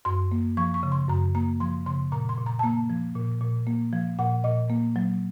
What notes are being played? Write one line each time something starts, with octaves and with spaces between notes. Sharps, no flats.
F#2 C6
A#3
F3 C#6
C#6
C#3
C6
F#2 A#5
A#3 A#5
F3 C6
C#3 C6
A#2 A#5
C6
A#2
A#5
A5
A#3 A#5
F3
A#2
A#2
A#3
F3
A#2 F#5
A#2 D#5
A#3
F#3